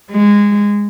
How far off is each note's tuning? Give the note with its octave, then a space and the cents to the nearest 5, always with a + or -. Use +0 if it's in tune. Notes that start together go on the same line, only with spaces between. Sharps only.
G#3 -15